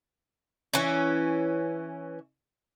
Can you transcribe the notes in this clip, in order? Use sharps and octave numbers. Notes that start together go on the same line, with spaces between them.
E3 C#4